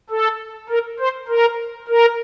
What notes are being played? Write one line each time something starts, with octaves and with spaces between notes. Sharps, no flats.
A4
A#4
C5
A#4
A#4